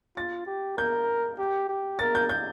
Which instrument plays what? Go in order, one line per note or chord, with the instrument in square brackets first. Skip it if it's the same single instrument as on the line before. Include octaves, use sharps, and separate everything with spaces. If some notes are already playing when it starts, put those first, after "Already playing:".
[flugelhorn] F4 [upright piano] A6
[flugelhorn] G4
[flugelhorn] A#4 [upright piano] G6
[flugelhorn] G4
G4
[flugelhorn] A#4 [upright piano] A6
[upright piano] G6
G6